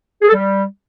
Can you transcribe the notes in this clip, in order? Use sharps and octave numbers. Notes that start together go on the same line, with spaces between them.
G#4
A4
G3